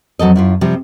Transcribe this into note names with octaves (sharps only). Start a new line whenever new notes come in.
F2 F#3 A4 D#5
F#2 E4 F4
C3 F3 G3